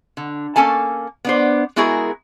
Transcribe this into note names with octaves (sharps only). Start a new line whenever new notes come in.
D3
A#3 C#4 A4 G#5 A5
B3 D4 C5
G#3 B3 E4 F#4 G#4 A#4